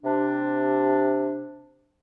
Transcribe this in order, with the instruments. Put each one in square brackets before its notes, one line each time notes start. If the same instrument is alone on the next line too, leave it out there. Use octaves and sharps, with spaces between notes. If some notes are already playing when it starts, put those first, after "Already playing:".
[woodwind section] C3 D4